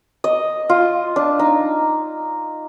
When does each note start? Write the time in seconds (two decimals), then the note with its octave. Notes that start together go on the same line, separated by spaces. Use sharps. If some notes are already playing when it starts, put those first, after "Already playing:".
0.24 D#5
0.69 F4
1.16 D4
1.39 D#4